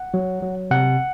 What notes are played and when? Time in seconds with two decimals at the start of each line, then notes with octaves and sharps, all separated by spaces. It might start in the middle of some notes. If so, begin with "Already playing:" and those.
Already playing: F#5
0.14 F#3
0.42 F#3
0.71 C3 F#5